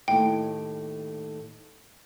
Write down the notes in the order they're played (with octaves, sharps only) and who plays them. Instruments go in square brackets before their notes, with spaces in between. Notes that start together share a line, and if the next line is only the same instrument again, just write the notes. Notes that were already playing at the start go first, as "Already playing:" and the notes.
[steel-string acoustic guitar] D#2 A2 [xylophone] G5